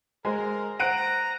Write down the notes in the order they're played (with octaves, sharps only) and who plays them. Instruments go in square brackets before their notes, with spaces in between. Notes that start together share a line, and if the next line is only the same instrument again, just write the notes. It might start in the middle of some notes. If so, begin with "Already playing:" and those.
[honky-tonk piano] G#3 [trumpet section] A#4 [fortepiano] C5 G#5
[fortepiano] C5 F#5 [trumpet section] A#5 [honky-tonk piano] F#6 D7 D#7